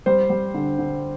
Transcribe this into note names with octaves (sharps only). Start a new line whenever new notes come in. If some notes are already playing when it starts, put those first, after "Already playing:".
G3 C5
G3
D3
D3